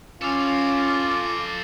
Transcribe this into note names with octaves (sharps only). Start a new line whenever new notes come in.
C#4 F4 A4 F5 D6